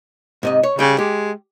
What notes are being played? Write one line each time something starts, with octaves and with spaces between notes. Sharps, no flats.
G#2 C3 D#5
C#5
C#3 G3 G5
G#3 G4